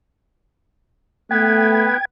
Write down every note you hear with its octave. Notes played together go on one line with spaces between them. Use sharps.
A3 B3 B4 G5 G#6